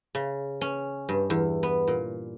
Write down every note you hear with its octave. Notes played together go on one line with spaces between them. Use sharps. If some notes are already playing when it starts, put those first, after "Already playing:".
C#3
C#4
G2
E2
B3
A#2